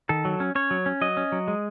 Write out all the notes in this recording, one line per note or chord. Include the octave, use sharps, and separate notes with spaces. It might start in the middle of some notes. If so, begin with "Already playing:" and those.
D#3 A4
F#3
C#4
C#4 C#5
F#3
C#4
F#3 D#5
C#4
F#3
G#3